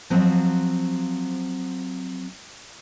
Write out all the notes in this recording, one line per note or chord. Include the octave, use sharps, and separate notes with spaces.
F3 F#3 C4